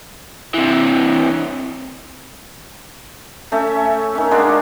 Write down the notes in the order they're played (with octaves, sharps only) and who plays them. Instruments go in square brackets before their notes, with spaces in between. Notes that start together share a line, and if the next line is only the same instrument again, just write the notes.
[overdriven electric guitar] C3 E3
[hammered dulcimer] A3 C#4 E5
D#3 C#4
G#3 A#3 D4 F#4